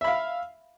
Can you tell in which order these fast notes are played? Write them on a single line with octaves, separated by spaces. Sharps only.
E5 B5 F5